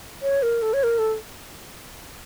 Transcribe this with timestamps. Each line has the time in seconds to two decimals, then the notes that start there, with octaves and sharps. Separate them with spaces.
0.22 C#5
0.43 A#4
0.62 A4
0.73 C#5
0.83 A#4
0.99 A4